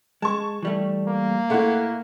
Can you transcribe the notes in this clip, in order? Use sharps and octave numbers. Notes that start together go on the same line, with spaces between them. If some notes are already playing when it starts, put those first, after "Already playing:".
G#3 A5 C#6
E3 G3 A3
A#3
A#2 A3 E4 F#5